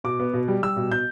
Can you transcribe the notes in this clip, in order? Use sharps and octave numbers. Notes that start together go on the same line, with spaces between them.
B2 D6
B3
B2
G3
G3 E6
B2
B2 G6